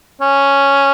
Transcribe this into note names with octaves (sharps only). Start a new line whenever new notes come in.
C#4